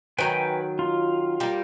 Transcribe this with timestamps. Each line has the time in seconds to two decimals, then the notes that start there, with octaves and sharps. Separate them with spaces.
0.19 D#3 F#3 B4 G5 G#5
0.79 F4
1.40 G3 A#3